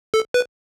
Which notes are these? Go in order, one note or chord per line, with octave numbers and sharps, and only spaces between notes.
A4
B4